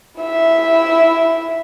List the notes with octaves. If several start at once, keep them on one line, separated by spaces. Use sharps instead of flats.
E4 E5